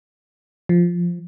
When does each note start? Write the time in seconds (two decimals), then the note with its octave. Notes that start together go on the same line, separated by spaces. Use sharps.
0.69 F3